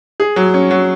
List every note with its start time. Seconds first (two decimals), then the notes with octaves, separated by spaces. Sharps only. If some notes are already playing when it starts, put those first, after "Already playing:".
0.20 G#4
0.36 F#3
0.54 C#4
0.71 F#3